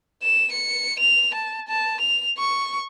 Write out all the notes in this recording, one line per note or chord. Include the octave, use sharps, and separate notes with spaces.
E7
C#7
F7
A5
A5
F7
C#6